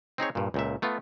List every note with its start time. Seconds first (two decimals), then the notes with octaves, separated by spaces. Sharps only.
0.18 C4 D#4 G#4 C#5
0.35 G2 A#2
0.54 C#2 A#2 E5
0.82 A3 B3 F4